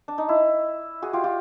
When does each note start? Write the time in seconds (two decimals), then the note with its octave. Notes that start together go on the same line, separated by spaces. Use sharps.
0.08 D4
0.18 D#4
0.29 E4
1.02 F#4 G#4
1.13 F4 G4
1.24 F4 G4